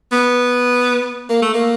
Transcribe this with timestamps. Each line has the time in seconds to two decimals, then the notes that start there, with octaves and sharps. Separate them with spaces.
0.12 B3
1.29 A#3
1.42 A3
1.54 A#3